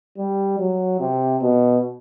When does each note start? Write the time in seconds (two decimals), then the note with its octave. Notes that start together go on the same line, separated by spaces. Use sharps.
0.18 G3
0.59 F#3
0.99 C3
1.41 B2